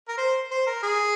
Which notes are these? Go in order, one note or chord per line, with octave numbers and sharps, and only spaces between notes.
A#4
C5
C5
A#4
G#4